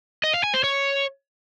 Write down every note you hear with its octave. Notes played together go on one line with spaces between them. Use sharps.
D#5
F5
G#5
C5
C#5